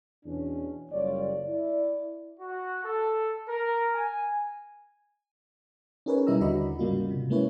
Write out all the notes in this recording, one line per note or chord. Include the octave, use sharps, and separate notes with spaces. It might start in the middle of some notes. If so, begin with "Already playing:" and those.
E2 B2 C#4 D4
F#1 G3 F4 C#5 D5
E4 D5
F#4
A4
A#4
G#5
C#4 D#4 G#4 A#4 B4 C#5
B2 G3 E4 D#5 A#5 E6
D#2 D3 F#4 D5 D#5 B5
G#2 C#3 G3 A#3 F4 F#4
C3
G#3 A#3 C#4 E4 B4 C#5